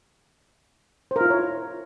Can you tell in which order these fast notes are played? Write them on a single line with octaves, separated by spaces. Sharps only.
C5 A#4 F4 E4 C#5